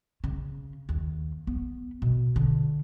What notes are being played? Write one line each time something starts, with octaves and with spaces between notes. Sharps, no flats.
C#3
D#2
B3
B2
D3